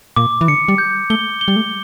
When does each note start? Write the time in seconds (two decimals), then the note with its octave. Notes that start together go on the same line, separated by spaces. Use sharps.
0.16 A#2 D6
0.41 E3
0.48 D3 C#7
0.68 G3
0.78 G6
1.10 A3 G7
1.41 G7
1.48 G3
1.56 A3